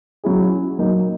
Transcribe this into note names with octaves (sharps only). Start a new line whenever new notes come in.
F#3 C#4 E4 G#4
F#3 A#3 D#4 A#4